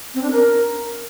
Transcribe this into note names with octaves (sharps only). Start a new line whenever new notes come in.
C4
D4
A#4